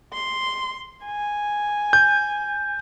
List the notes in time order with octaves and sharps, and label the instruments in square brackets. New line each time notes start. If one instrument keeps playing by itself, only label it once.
[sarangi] C6
G#5
[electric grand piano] G6